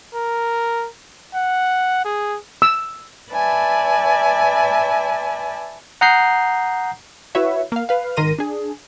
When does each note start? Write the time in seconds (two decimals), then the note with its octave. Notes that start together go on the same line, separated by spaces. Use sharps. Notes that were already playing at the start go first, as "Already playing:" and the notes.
0.15 A#4
1.35 F#5
2.05 G#4
2.62 E6
3.32 B4 D5 E5 G#5 A5
6.01 F#5 A#5 D#6 G6 C7
7.35 E4 F#4 B4 C#5 E5
7.72 A#3 F5
7.89 B4 F5
8.16 G#1 D#3 A#4 C6 A#6 D#7
8.38 D4 G#4